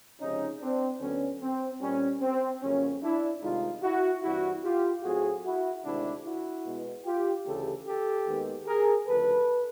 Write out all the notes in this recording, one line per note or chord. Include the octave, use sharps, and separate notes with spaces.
C#2 C3 F3 G#3 C#4 D#4
C4 D4
D2 D3 F#3 B3 C#4
C4
A#2 G3 C4 C#4
C4
F2 C#3 F#3 A#3 C#4
D4 E4
C2 C3 D#3 G#3 D#4 F4
E4 F#4
G2 E3 G3 C4 E4 F#4
F4 G4
A2 F#3 A3 C4 F#4 G#4
E4 F#4
D2 C3 D#3 G#3 C4 D4 E4
E4 F#4
B2 G#3 B3
F4 G4
D2 C#3 E3 A3 G4 A4
G4 A4
D#2 D#3 G#3 B3
G#4 A#4
D2 C#3 F3 A4 B4